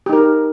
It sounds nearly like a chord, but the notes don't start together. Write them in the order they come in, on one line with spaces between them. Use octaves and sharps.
G4 D#4 A#4